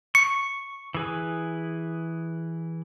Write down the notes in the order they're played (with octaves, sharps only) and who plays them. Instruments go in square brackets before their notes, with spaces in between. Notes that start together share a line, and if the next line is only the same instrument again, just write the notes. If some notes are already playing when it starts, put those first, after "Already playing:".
[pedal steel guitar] C#6 [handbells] C#7
[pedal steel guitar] E3 G#4 B4